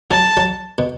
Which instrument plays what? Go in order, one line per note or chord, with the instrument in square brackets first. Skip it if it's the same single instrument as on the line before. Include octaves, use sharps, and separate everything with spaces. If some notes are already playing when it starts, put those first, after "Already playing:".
[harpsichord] F#3 [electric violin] A5
[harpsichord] F#3
B2